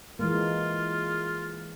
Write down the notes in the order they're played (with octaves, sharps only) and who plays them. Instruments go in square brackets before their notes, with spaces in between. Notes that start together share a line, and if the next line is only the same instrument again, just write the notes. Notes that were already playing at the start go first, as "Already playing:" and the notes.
[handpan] E3 G#3 A#3 [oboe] F4